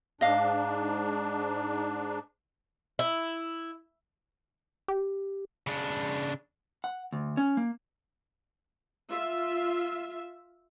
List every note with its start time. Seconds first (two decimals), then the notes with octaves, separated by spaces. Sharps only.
0.21 G#2 D4 D#5 F5
2.99 E4
4.88 G4
5.67 C#3 D4
6.84 F#5
7.12 D2
7.37 C#4
7.57 A#3
9.10 F4 E5